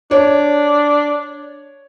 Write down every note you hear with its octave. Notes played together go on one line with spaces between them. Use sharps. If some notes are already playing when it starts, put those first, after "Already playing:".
D4 C#5